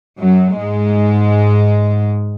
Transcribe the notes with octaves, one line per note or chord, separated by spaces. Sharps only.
F#2 F#3
G#2 G#3